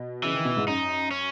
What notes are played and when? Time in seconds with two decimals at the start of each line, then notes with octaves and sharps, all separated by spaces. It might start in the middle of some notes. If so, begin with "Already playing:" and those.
Already playing: B2
0.23 C#3 E3
0.34 D#3
0.45 B2
0.57 G#2
0.67 F#2 D#4
1.11 C#4